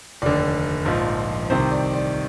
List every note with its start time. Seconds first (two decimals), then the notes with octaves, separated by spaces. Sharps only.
0.22 F1 D#2 D3 D5
0.85 A#1 G#2 F3
1.50 C2 C3 D#3 C5
1.71 D5
1.94 D5